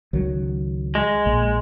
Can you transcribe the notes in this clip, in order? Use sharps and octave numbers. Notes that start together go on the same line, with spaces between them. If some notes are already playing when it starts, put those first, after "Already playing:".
C#2 D#3 F#3
G#3
A#1 A#2